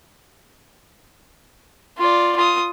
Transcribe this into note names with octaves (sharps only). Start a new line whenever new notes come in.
F4 D5
F4 D#6